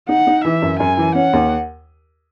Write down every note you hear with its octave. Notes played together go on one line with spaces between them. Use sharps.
D#4 F#5
D#4
E3 E5
F#2
F#2 G#5
E3
C#4 F#5
D#2